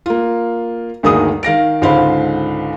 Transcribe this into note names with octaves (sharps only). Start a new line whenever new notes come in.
A#3 F4
D2 G2 D#3 A#3 G#4 D#6
D#3 F5 A#6 D7
C#2 G#2 D3 C5 F5 B5